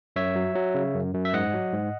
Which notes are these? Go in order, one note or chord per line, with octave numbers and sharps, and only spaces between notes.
F#2 C#5 E5
F#3
F#3
C#3
F#2
F#2
E5
G#2 D#5 F#5
F#3
G#2